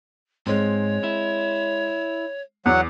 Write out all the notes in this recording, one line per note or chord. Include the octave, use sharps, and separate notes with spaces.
G#2 G#3 C4 C#5
E4
E2 F#3 F#5